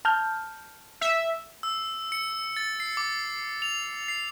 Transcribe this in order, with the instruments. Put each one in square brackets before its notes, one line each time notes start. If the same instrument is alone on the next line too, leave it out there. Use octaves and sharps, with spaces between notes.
[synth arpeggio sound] A5 F6 G6
[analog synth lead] E5
[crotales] E6
C#7
A6
C7
D6
F7
C7